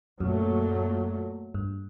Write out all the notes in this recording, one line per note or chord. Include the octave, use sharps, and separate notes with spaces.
F#2 A#2 F#3 A3
G2